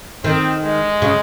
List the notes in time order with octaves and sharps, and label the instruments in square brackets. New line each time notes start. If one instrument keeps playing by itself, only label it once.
[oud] D#3 [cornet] C4
[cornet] G#3
[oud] C#3